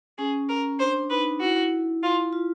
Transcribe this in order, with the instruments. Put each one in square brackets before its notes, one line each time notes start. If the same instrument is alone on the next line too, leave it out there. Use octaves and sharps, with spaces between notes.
[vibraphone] C#4 [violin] G#4
[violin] A#4
[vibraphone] D4 [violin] C5
[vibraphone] D#4 [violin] B4
[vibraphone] E4 [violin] F#4
[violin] F4
[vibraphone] F4